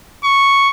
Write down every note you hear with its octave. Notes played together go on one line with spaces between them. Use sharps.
C#6